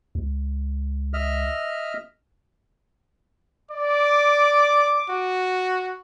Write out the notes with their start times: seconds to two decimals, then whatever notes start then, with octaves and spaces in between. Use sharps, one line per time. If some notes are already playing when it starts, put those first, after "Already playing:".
0.15 C#2
1.13 D#5 E5 F6
3.71 D5 D6
5.09 F#4